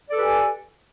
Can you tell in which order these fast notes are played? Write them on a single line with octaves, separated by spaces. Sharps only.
D5 A4 B4 G4 G#5